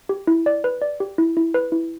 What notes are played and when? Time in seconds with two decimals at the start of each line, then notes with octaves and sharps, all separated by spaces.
0.09 G4
0.27 E4
0.46 D5
0.64 B4
0.82 D5
1.00 G4
1.18 E4
1.37 E4
1.54 B4
1.72 E4